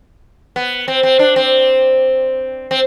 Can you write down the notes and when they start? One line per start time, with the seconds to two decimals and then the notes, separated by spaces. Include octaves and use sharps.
0.56 B3
0.88 C4
1.03 C4
1.19 D4
1.36 C4
2.71 C4